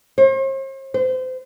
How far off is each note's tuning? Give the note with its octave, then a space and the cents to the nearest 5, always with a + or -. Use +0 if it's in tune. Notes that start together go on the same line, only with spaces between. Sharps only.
C5 +45
C5 -30